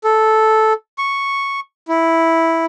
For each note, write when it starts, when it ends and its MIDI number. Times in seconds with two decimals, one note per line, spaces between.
0.04 0.73 69
0.98 1.60 85
1.88 2.66 64